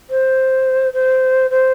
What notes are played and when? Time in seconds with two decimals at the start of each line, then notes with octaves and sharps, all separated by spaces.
0.10 C5
0.93 C5
1.50 C5